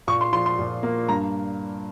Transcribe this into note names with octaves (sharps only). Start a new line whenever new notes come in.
A#2 C#6
C6
F3 C6
C6
A#2
A#3
G2 A#5